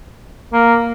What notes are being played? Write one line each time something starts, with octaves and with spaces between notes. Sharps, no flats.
A#3